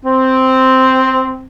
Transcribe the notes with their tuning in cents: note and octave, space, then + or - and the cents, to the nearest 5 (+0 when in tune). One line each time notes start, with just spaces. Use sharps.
C4 -5